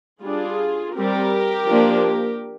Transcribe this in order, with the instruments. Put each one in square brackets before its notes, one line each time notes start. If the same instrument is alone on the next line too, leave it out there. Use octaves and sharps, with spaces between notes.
[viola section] G3 D4 F4 G#4
G3 C4 G4 A#4
F3 A#3 D4